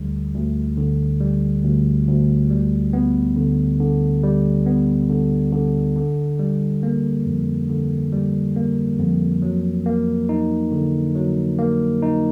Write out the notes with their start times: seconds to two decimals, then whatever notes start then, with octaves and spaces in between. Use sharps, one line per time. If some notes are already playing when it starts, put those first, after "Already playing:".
Already playing: D2 D3 G3
0.34 D2
0.77 D3
1.20 G3
1.64 D2
2.07 D2
2.50 G3
2.93 B3
3.36 D3
3.80 D3
4.23 G3
4.67 B3
5.10 D3
5.53 D3
5.96 D3
6.39 G3
6.83 A#3
7.26 F2
7.69 D3
8.13 G3
8.56 A#3
8.99 F2
9.42 F#3
9.86 A#3
10.29 D#4
10.72 D3
11.16 F#3
11.59 A#3
12.03 D#4